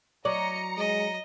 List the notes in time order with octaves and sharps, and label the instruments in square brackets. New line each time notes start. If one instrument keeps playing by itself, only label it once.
[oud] F#3 D5 [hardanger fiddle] D#5 [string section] A#5 C#7
[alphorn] G#3 [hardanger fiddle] D#5